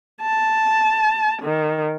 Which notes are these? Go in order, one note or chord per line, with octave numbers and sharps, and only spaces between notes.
A5
D#3